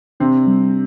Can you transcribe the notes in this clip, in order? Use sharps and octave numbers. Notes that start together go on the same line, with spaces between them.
C3 C4 D4
G3